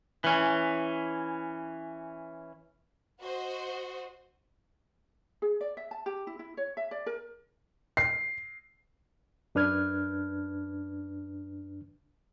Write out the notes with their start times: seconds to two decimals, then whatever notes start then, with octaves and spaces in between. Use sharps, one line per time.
0.24 E3 C#4
3.21 F#4 C5 D#5
5.42 G#4
5.61 D5
5.77 E5
5.91 A5
6.06 G4
6.27 E4
6.39 E4
6.57 C#5
6.77 E5
6.91 D5
7.06 A#4
7.97 C7
9.55 F#2 D4 B4 F6 G#6